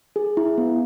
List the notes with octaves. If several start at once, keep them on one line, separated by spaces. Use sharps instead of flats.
G#4
E4
B3